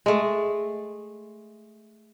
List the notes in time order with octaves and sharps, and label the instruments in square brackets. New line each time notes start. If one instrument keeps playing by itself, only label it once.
[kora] G#3 A3